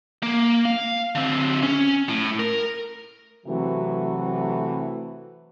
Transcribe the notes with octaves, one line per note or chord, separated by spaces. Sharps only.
A#3
F5
D3 C4
C#4
A2
A#4
C3 E3 F#3 A3 F#4